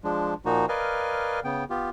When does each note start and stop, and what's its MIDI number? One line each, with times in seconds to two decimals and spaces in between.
0.04 0.34 53
0.04 0.34 56
0.04 0.34 62
0.45 0.66 46
0.45 0.66 53
0.45 0.66 58
0.45 0.66 63
0.45 0.66 66
0.69 1.40 70
0.69 1.40 71
0.69 1.40 74
0.69 1.40 75
0.69 1.40 77
0.69 1.40 80
1.44 1.64 49
1.44 1.64 59
1.44 1.64 79
1.70 1.90 59
1.70 1.90 65
1.70 1.90 67